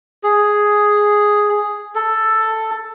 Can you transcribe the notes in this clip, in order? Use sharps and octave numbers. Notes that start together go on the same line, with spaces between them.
G#4
A4